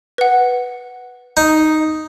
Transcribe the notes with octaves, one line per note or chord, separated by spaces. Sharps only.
B4 F#5
D#4